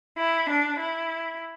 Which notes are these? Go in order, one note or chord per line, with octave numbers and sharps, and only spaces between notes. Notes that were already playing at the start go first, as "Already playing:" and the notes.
E4
D4
E4